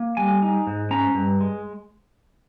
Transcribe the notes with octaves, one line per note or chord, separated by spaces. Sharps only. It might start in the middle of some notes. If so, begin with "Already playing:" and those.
Already playing: A#3
G3 G#5
D#4
G#2
C#4 A#5
G2
G#3